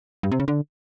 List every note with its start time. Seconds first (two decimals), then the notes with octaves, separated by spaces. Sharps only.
0.23 G2
0.32 C3
0.40 C#3
0.48 D3